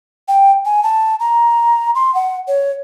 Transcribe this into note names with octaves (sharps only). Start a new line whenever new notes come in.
G5
G#5
A5
A#5
C6
F#5
C#5